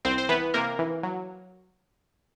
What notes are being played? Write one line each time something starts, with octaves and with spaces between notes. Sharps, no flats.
C2 C4 C5
C5
E3 B3 B4
C3 A#3 A#4
E3
F#3